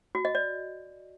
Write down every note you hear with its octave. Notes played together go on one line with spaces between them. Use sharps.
F#4
D#5
D5